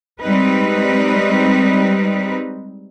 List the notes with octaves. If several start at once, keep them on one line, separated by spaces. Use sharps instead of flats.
G3 G#3 C4 D#4 B4